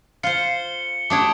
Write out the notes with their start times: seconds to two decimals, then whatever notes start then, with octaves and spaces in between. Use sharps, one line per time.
0.23 F4 C5 C#7 G7
1.10 A3 D4 G4 D6 D#6 G#6